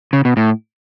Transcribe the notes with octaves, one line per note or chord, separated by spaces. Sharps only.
C#3
B2
A2